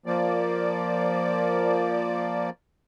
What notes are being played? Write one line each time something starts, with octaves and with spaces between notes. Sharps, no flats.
F3 A#3 D5